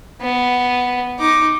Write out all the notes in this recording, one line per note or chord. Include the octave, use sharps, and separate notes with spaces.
B3
D#4 D6